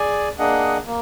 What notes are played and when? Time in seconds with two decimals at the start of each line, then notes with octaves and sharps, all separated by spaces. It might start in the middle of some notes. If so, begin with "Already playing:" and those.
Already playing: G#4 D5 G#5
0.39 A#3 D4 G#4 D#5 F#5
0.87 A#3